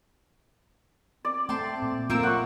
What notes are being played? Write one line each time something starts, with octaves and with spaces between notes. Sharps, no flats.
C4 D5
A3 C4 G5 A5 C6
A#2
A3 A#3 C4 F4 A#4 E6
F#3 F#5 C#6